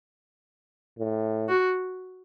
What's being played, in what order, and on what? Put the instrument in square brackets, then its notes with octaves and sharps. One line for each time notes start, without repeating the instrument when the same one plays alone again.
[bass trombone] A2
[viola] F#4